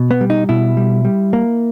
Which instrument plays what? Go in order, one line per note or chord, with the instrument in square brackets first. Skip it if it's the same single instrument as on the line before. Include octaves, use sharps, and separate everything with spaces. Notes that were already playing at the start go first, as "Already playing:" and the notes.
Already playing: [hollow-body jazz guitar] B2
B3
G3
D#4
B2 E4
G3
G3
A#3